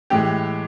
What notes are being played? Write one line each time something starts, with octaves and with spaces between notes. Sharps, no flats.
A2 E3 G#3 G4